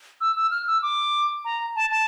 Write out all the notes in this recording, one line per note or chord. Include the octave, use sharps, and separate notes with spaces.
E6
E6
F6
E6
D6
A#5
A5
A5